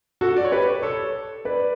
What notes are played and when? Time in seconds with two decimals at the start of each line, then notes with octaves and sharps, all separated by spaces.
0.21 F#4 A4
0.36 D5
0.45 C#5
0.52 G4 B4
0.82 A4 C#5
1.45 B4 D5